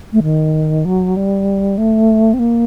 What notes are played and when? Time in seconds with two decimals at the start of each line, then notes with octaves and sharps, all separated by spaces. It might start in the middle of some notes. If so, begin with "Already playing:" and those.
0.13 A3
0.23 D#3
0.85 F#3
1.17 G3
1.78 A3
2.34 C4
2.39 A#3